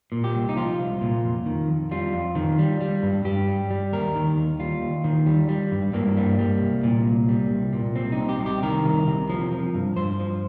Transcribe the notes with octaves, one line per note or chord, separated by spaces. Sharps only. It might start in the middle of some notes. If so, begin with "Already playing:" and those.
A#2
G4
C2
D#4
F3 F4
C2
A#2
F2
D#3
F2
G3 F4
F2
D#3
G3
G3
G2
G2 G4
G3
G3
D#2 A#4
D#3
D#2
G3 F4
D#2
D#3
G3
G3
G2
G2 A#3
G3
G3
C2
A#2
C2
G3
C2
A#2
C2 C4
D#4
C3
G4
C2
G4
D#3 A#4
C2
C3
F3
F3
G2
G2 C5
F3